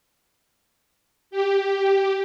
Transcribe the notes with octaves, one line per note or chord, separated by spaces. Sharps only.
G4